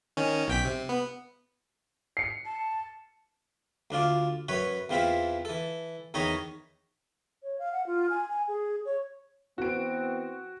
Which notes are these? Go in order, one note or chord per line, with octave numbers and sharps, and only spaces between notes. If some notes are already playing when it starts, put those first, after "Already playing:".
D#3 C#4
B1 G5 B6
C3
B3
C7 C#7
A5
D2 D4 F4 D5
F#2 B4 C#5 B5
E2 E3 C4 F4 E5 B5
E3 A4
E2 D#3 D#4 C#5 A#5 B5
C#5
F5
F#5
F4
G#5
G#5
G#4
C#5
E3 B3 C4 F#4 D7